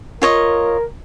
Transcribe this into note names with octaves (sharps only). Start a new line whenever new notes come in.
F4 A#4 C#5 D#5